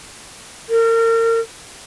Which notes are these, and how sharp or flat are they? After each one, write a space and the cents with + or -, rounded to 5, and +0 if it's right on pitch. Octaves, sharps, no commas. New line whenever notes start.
A#4 -35